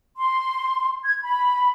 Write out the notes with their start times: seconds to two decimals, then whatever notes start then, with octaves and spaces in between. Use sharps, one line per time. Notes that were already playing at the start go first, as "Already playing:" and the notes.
0.18 C6
1.04 G#6
1.22 B5